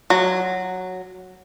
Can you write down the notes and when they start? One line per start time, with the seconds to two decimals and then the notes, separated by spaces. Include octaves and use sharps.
0.10 F#3